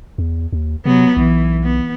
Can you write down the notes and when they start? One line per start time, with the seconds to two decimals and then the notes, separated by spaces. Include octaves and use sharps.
0.18 E2
0.53 D#2
0.85 C3 F#3 B3
1.17 B1 E3
1.64 B3